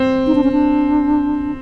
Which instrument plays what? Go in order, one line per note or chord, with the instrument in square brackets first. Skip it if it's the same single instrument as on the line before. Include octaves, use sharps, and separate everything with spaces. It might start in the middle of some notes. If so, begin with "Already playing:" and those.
Already playing: [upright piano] C4
[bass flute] D#4
D4
C#4
D4